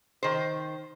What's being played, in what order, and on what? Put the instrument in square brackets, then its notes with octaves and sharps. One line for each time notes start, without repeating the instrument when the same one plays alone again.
[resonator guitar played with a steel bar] D#3 C5